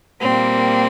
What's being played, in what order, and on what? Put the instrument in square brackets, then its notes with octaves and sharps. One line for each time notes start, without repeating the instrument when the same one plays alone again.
[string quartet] A#2 G3 A#3 C4